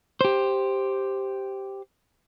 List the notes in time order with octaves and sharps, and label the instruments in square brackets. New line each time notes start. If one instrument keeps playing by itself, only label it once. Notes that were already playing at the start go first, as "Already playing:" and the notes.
[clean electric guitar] G4 C5